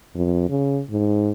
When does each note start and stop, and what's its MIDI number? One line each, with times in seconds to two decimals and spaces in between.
0.15 0.48 41
0.49 0.81 49
0.90 1.32 44